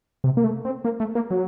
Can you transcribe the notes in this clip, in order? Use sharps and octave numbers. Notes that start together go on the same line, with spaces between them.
C3
A#3
A3
C4
A#3
A3
A#3
F#3